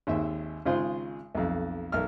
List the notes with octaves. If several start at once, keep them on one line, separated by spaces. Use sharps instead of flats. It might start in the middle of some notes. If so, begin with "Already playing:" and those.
G#1 D#2 E5
G#1 C#3 G#3 F4 G#4 C5
B1 F2
B1 A#4 F6